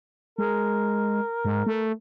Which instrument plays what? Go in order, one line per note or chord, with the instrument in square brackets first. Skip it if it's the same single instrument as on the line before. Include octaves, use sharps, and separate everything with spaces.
[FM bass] G#3 [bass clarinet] A#4
[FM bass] G#2
A3